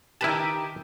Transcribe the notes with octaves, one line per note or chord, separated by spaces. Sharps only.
D#3 E4 G4 B4 A5